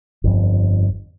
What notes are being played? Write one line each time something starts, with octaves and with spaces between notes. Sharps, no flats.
G1 F2